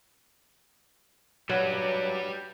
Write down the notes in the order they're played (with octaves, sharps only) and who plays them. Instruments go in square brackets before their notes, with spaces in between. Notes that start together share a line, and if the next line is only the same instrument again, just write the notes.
[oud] F#3 [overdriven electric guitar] G3 B4